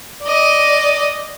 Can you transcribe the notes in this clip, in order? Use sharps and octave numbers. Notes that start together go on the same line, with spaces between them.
D5 D#5